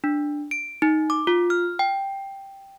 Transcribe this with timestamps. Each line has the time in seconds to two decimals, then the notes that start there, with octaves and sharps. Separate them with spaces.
0.04 D4
0.51 D7
0.82 D#4
1.10 D6
1.27 F4
1.50 F6
1.79 G5